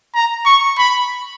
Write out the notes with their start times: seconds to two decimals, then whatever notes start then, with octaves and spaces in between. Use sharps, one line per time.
0.15 A#5
0.46 C#6
0.78 B5